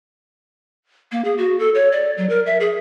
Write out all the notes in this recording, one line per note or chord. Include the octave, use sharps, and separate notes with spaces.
A#3
G#4
F#4
A4
C#5
D5
F#3
A#4
E5
G#4